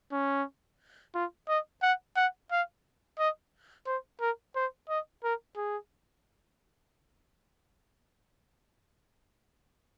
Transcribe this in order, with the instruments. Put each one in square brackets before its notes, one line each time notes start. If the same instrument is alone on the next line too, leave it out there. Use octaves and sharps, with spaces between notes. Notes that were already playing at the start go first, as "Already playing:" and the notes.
[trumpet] C#4
F4
D#5
F#5
F#5
F5
D#5
C5
A#4
C5
D#5
A#4
G#4